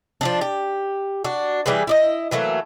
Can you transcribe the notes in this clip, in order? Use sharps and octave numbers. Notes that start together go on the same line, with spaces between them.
F3 F#3 D4
G4
D4 F#4
E3 G3 G#4 B4
E4 D5 D#5
E3 F#3 A3 A#3